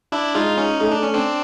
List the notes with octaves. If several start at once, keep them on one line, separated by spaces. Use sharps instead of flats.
D4 E4
G#3 D#4 F4
C#4 D#4
A3 D#4
D4
C#4
C4 D4